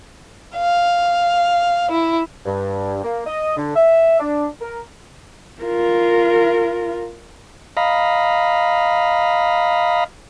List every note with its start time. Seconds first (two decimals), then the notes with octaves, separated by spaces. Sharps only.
0.55 F5
1.91 E4
2.45 G2
3.04 A#3
3.27 D#5
3.57 D3
3.76 E5
4.20 D4
4.61 A#4
5.62 F4 A#4
7.77 D#5 F5 A#5 B5